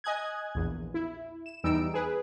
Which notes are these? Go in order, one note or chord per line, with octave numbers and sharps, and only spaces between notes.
D#5 G#5 D#6 F#6 G#6
A#1 E2
E4
E7
E2 G3 D#4 E6 D7
G#4 B4